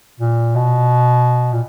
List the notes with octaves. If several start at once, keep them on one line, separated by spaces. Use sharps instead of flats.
A#2
B2
A#2